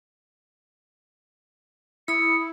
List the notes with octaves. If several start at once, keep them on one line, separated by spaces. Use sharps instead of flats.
E4 B5 D#6 C#7